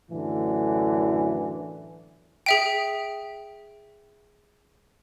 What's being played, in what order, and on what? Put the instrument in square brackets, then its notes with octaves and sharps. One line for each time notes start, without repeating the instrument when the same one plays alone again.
[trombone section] F#2 A2 D3 E3
[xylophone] G#4 E5 G5